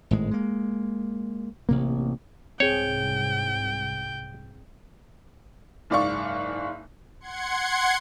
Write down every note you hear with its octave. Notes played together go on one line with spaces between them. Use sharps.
G#1 A2 G#3
G#3 A#3
A1 C3 A#3
C2 G#2 C4 G#4 C#5 G5
F#1 G#2 D5 F5 C#6
F#5 C6 G#6 C#7